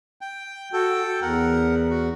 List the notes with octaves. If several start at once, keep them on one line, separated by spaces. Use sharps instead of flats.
G5
F#4 A4 G5
E2 A#4 F#5
F#4